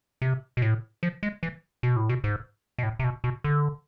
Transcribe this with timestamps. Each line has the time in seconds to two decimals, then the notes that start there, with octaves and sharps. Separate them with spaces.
0.22 C3
0.57 B2
0.62 A2
1.03 F3
1.23 G#3
1.43 E3
1.83 B2
1.96 A2
2.09 B2
2.24 G#2
2.78 B2
2.83 A2
2.99 C3
3.04 B2
3.24 B2
3.44 D3